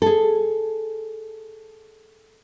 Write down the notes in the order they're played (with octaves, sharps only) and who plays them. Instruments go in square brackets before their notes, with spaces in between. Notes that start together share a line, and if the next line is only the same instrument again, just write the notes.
[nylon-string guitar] G#4 A4